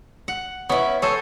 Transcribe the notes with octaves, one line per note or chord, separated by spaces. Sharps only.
F#5
B3 C#4 E4
G#4 A4 C5 C#5